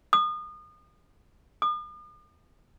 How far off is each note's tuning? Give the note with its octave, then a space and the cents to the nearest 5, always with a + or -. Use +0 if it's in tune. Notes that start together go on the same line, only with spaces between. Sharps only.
D#6 -35
D#6 -45